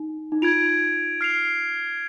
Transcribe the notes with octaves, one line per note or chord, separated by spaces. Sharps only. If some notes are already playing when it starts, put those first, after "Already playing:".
Already playing: D#4
D#4
F4 G#6 D7 F7
F6 C7 F7